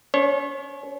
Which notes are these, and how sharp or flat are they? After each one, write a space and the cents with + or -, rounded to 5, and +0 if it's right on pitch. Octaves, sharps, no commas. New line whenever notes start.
C#4 +40 C#5 -30